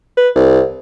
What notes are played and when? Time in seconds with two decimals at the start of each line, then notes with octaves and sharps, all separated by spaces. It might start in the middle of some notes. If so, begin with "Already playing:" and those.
0.17 B4
0.35 C2